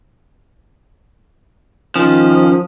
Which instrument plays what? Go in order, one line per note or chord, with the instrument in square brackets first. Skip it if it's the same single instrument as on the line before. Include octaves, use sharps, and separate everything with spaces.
[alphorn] D#3 [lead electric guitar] F3 [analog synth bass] C#4